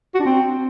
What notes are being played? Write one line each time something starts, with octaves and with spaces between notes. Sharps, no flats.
F#4
D4
C4